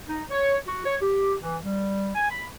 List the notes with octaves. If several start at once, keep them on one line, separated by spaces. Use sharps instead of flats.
D#4
C#5
F#4
C#5
G4
E3
G3
G#5
B5